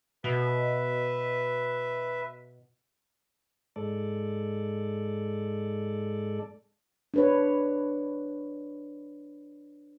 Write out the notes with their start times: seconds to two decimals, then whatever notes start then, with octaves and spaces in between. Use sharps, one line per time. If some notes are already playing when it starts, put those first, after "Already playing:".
0.24 B2 B4 E5
3.76 G#2 G#3 A4 D5
7.14 D4 B4 C#5